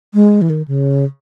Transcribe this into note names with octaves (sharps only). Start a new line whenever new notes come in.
G#3
E3
D#3
C#3